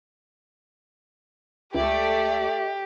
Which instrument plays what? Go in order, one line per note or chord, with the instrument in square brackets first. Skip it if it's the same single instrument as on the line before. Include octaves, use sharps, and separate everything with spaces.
[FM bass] C#2 [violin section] A3 D5 [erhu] G4 [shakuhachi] E5